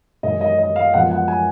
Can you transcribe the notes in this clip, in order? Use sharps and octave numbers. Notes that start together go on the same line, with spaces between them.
F#2 D#3 G#3 D#5
D#5
D#5
F5
F#2 F3 G#3 B3 F#5
F#5
G#5